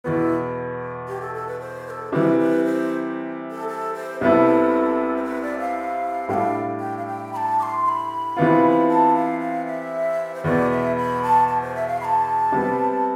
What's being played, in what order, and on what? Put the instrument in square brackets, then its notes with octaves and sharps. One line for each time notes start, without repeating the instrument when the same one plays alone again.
[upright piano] E2 B2 B3 [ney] E4 F4
[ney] G4
A4
A4
B4
C5
B4
A4
[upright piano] C3 E3 G3 [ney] B4
[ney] B4
C5
A4
A4
C5
[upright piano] C2 C3 G3 B3 E4 [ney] A4
[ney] C5
B4
D5
F5
[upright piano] A2 G3 D4 A4 [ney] G5
[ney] F5
G5
F5
G5
B5
A5
D6
C6
C6
B5
[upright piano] C3 E3 B3 F4
[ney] A5
F5
F5
E5
C5
[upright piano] E2 B2 B3 [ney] D5
[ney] E5
B5
A5
A5
C5
E5
F5
B5
A5
[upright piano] C3 G3 B3